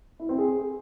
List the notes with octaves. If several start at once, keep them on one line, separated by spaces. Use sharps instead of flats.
E4
C4
G#4